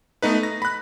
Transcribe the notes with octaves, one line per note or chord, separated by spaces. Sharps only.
A3 B3 D#4 B4
A#6
B5 F#6